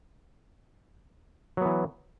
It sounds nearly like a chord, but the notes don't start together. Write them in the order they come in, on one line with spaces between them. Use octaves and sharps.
F#3 B3 E3